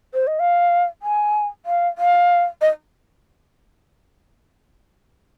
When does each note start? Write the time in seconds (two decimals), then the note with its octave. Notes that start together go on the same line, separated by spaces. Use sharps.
0.14 C5
0.27 D#5
0.39 F5
1.02 G#5
1.66 F5
1.98 F5
2.61 D#5